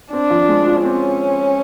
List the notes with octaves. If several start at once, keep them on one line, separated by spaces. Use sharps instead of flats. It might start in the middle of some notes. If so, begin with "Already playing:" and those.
C4 D4
F3
G#3
F4
C4 C#4